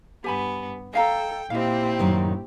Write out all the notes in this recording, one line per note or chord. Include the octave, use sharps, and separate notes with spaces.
G2 B3 G4 G#5 B5
A4 D#5 F5 G5 A#5
A#2 C4 E4 G4 D#5 F5
F#2 A2 D#3